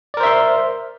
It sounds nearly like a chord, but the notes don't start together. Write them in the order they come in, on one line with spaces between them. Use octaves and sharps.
D5 A#4 C5 E5 C6